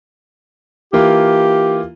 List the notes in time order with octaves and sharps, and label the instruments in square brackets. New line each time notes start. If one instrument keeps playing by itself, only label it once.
[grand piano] E3 A#3 F4 [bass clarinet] G4